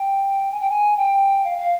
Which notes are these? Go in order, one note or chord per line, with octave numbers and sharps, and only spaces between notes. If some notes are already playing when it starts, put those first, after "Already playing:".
Already playing: G5
G#5
G5
G#5
G5
F5
F5